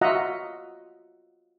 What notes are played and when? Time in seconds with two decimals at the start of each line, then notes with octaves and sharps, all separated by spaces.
0.01 F4 F#4 D#5 E5 F#5 A#5